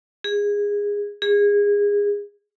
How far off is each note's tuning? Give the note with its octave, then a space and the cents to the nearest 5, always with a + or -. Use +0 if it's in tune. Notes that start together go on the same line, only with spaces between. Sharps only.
G#4 -20
G#4 -25